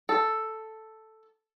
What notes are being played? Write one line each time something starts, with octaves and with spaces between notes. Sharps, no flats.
A4